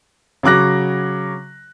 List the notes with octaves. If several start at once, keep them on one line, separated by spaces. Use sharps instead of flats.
C#3 F#3 D6 F#6 A#6